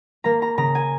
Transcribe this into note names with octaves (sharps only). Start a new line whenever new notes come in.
A#3 A#5
A#5
C#3 A#5
G#5